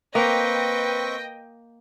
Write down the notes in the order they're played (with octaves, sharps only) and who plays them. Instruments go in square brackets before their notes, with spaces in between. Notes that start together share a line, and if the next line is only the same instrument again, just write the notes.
[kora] A#3 [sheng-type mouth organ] C4 C#6 [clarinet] B4 [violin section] D#5 G5 A#6